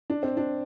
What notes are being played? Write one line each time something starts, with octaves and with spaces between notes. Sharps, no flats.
D4
C4
D4